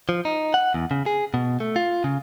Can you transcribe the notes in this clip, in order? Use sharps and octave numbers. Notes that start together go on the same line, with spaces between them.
F3
D#4
F#5
E2
C#3
G#4
B2
A3
F4
C#3